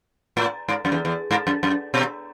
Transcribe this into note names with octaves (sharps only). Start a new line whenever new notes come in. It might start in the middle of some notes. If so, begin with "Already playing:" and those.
A2
G#2
F#2
E2
E2
G#2
F#2
F#2
B2